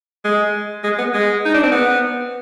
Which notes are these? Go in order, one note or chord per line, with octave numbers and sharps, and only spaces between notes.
G#3
G#3
B3
G#3
D#4
D4
C4
B3